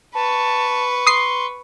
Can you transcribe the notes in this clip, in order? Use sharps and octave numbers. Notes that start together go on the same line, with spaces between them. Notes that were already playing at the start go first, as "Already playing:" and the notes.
B4 A5 C#6
C6 D#6 C7